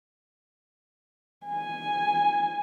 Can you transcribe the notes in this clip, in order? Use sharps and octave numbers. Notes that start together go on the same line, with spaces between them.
G#5